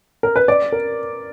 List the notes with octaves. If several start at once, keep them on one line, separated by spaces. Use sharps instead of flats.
A#4
B4
D5
A#4